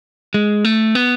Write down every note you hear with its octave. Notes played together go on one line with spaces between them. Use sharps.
G#3
A3
B3